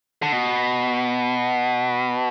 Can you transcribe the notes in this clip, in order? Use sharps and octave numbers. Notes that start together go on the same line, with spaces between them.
D3
B2